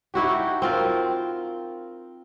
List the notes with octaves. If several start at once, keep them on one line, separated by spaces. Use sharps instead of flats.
D#4 E4 F#4 G4
C4 F4 A#4